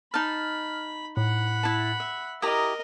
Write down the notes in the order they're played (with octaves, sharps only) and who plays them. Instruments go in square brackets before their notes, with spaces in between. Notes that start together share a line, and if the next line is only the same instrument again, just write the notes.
[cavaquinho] D#4 A5 [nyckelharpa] B5 [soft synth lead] F6
[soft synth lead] A2 [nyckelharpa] F#5 B5
[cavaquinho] E4 A5
E5
[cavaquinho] E4 G4 A#5 [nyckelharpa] A#4 D#5 [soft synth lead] D#6